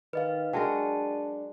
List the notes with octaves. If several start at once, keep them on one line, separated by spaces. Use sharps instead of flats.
D#3 B4 D#5 F5
F#3 G#3 D4 A#4 G5 A5